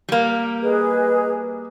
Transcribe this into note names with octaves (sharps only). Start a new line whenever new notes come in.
G3 A#3
G#4 B4 D#5